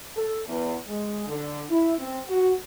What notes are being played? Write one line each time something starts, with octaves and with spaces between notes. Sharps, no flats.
A4
E2
G#3
D3
E4
C4
F#4